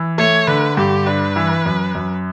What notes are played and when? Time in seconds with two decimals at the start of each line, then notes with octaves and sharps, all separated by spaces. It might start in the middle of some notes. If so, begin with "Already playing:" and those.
Already playing: E3
0.18 A3 C#5
0.48 D3 B4
0.77 G2 G4
1.06 D4 B4
1.36 E3
1.66 F#2
1.95 F#2